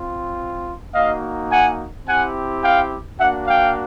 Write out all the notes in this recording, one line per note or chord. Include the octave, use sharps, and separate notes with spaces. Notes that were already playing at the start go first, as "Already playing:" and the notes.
Already playing: C4 F4
A#3 D#4 F#4 D#5 F5
F#5 G#5
C4 E4 G4 F#5 G#5
F5 G5
A#3 D4 F#4 E5 F#5
F5 G5